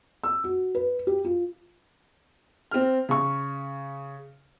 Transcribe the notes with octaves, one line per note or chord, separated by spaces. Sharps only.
E6
F#4
B4
G4
F4
C4 F6
C#3 C#6